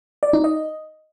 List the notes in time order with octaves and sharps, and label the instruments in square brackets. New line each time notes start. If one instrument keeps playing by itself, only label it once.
[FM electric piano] D5
D#4
D#5